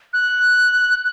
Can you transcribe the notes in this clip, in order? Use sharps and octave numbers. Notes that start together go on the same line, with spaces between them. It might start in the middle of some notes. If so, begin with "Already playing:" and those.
F#6